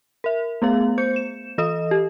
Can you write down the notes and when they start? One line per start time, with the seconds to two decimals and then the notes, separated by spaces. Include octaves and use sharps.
0.24 A#4 E5
0.62 A3 B3 G#4 F5
0.98 C5 G6 C#7
1.16 E7
1.58 E3 A4 D#5 D#6
1.91 G4